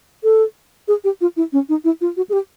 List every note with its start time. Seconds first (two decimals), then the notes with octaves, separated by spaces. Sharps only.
0.24 A4
0.88 G#4
1.04 G4
1.21 F4
1.37 E4
1.53 C#4
1.69 D#4
1.84 E4
2.01 F4
2.17 F#4
2.29 G#4
2.33 G4